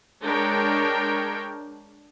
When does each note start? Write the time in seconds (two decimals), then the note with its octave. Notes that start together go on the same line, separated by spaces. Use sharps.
0.23 G#3 D4 A#4 C#5 G5